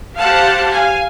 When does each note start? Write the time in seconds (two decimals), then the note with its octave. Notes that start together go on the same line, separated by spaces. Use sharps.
0.17 G4 C5 F5 F#5 A5
0.69 F5 G#5